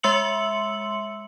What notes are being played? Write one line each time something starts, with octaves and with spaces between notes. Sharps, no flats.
G#3 E5 C6 E6 C#7 F#7